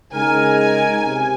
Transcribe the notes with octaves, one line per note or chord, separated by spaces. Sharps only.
C#3 G#3 D#4 A#4 G#5
C3